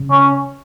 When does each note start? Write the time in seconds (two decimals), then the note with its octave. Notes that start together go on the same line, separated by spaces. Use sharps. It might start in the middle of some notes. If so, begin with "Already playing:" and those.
Already playing: C#3
0.11 C#4